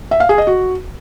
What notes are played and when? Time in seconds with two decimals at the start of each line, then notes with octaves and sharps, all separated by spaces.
0.11 E5
0.20 F5
0.29 G#4
0.38 D#5
0.47 F#4